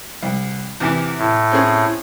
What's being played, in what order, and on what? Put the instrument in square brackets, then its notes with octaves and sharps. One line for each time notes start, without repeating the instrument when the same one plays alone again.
[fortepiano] C2
E2 C3 E3
[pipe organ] A2
[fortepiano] C4 C#4 G#4